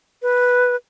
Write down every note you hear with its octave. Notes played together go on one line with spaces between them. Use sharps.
B4